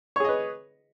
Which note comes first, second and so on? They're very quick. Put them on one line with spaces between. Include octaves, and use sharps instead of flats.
C#5 G#4 D#5 B4